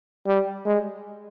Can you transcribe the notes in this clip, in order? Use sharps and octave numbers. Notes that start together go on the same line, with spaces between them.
G3
G#3